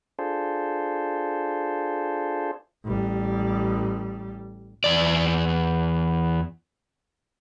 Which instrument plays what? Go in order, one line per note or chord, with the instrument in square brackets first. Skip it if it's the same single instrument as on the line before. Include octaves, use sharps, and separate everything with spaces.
[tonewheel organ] D4 F4 G#4 A4 C5
[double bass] A1 G3
[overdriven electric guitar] E2 D5